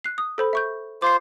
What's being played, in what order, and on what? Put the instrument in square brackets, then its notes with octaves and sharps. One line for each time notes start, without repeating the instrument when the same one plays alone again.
[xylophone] F#6 C7
D#6
A4 C5 B5
E5 C#6 G6
[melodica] F4 C5 [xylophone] D6 C7